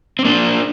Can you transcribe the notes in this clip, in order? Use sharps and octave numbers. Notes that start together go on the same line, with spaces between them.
C4
A#3 D4